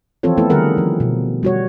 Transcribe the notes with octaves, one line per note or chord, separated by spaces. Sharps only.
E3 F3 C4 F4 A4 C#5
A3 B3 E4 A4
D3 D#3 G3 G#4 A#4 F#5
F3
B2
G3 F#4 C#5